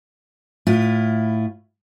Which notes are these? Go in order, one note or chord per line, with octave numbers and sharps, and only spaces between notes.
A2 E4 F4